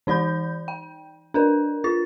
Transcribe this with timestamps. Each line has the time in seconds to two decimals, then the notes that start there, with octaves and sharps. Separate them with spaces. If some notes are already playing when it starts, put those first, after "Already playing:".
0.07 E3 D#4 D5 B5 G6
0.68 G5
1.34 D4 A#4 B4
1.84 F4 A6